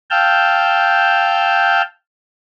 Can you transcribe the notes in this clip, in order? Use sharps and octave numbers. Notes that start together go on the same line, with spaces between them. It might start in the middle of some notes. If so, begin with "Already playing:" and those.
F5 G5 A5 E6 F6 G6